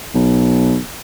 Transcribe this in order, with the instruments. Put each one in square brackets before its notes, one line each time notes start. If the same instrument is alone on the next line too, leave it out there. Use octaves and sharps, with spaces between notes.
[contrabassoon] B1